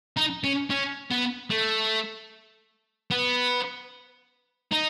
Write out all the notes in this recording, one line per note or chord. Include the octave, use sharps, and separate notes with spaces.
D#4
C#4
C#4
B3
A3
B3
D#4